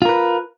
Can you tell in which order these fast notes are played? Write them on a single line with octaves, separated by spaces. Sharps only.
F4 A#4 B4